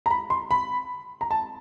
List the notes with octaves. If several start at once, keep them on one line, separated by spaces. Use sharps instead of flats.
A#5
B5
C6
B5
A#5
A5